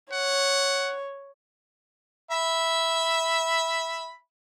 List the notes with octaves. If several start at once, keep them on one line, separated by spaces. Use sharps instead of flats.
C#5 F#5
E5 B5